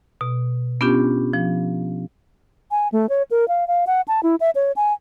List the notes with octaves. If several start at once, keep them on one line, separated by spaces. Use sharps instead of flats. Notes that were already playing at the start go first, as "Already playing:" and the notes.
B2
B3 C#4 D4 F4 G4
F3
G#5
A3
C#5
A#4
F5
F5
F#5
A5
E4
E5
C#5
G#5